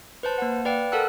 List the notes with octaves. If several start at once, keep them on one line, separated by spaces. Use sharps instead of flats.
B4 C5 A5
A#3 F#5
B4 D5 F5 G5
A4 A#4 F#5 A5 E6 F#6